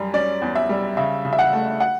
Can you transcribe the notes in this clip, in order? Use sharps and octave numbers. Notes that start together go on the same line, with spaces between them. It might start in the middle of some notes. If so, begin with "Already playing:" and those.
Already playing: F#2 G3
C#4 D5
E2
E5
G3
C#3 E5
C#3
E5
F#5
A3
F#5